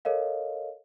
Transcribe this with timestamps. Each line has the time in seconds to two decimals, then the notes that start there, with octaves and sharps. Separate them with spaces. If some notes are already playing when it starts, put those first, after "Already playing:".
0.05 A4 A#4 C#5 D#5 F5